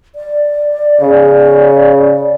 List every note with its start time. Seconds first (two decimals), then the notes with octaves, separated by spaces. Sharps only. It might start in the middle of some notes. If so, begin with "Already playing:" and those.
0.15 D5
1.01 C#3